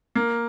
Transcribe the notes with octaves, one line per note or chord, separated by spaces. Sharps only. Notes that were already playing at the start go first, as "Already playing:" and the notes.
A#3